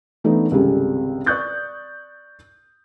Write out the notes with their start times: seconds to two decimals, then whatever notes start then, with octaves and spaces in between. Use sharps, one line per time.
0.24 E3 A3 B3 D4 D#4
0.51 G#1 C#2 C3 G3 G#4 A4
1.26 D5 C#6 D#6 F#6 G6 A6